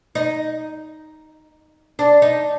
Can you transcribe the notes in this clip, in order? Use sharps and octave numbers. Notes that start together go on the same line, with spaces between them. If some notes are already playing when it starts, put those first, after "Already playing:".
D#4
D4
D#4